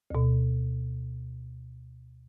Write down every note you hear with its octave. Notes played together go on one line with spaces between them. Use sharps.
D2 B2